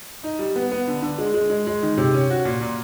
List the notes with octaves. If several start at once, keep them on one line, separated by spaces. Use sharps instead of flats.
D#4
G3
B3
B3
D3
D3
G#3
G#3
G#3
G#3
D#3
C3
C#4
F#4
A#2
A#2